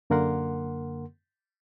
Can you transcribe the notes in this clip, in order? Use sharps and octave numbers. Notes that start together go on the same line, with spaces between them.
F#2 D3 A#3 A#4 F#5 C6